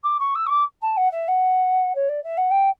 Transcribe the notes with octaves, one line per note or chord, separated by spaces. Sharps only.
D6
C#6
E6
C#6
D6
A5
F#5
E5
F#5
C#5
D5
E5
F#5
G5